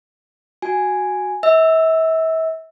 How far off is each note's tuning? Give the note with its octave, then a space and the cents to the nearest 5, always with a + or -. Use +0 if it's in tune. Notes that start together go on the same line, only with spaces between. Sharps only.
F#4 +0 G#5 +0
E5 -40 E6 +0